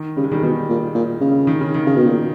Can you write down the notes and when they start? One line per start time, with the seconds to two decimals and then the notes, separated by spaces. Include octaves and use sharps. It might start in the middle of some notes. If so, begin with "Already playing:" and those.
Already playing: D#3
0.16 C#3 G3
0.24 G#3
0.31 D#3 G3
0.42 B2 D#3
0.69 A#2
0.95 A#2
1.21 C#3
1.47 D#3
1.61 C#3
1.74 D#3
1.86 C#3
1.96 B2
2.06 A#2